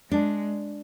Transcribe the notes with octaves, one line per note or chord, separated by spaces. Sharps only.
G#3 D4